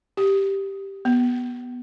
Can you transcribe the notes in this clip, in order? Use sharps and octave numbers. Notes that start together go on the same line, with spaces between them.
G4
B3